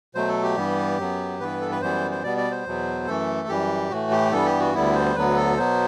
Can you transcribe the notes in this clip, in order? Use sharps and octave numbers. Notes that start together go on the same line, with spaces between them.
B2 F#3 A3 C5
A4
G4
G2 E3 G3 B3
F#2 F#3 B3
G2 E3 B3 B4
A4
B4
F#2 E3 G3 B3 C5
C5
B2 G3 B3 D5
D5
C5
E2 B2 F#3 B3
F#2 E3 A3 A4
F#2 E3 G3 G4
A2 E3 A3 F#4
G4
G2 E3 G3 B3 A4
G4
F#4
D2 D3 G3 B3 E4
C5
D2 D3 F#3 B3 B4
A4
B2 F#3 B3 C5